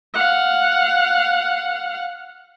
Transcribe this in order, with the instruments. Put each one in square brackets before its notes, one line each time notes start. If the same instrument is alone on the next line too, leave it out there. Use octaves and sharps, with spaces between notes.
[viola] F5 F#5